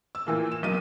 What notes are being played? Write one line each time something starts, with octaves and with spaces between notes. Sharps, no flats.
E6
A#2 E3 A#3
E7
B1 A#3 D#7